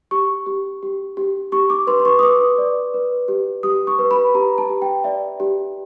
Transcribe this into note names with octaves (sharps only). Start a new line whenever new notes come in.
G4 C#6
G4
G4
G4
G4 C#6
D6
B4 C6
C6
C#6
D#6
B4 D6
D5
B4
G4
G4 D#6
C#6
B4
B5
G4 A#5
A5
G4
G5
D5 E5
G4